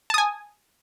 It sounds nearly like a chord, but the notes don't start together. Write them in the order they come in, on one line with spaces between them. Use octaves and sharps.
A5 D#6 G#5